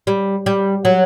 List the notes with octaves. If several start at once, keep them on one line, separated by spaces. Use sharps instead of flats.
G3
G3
F#3